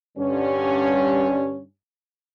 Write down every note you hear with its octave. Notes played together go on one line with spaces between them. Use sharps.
G2 D3 C#4